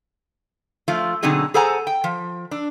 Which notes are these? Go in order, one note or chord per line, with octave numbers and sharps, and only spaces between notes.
F3 A3 F4
B2 D3 F#3 C4 D#4 G#4
G#4 A4 C5 F#5 G#5 A#5
G5
F3
D4